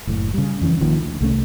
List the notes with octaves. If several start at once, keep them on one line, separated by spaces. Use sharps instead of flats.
F#1 A2
C#3 G3
F2 E3 C#4
A#1 A#2 D#3 F3
D2
C2 A3 C#4